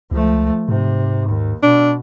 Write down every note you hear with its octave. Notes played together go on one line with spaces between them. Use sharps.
C#2 F3 A3
G#2 C3
D#2
B2 D4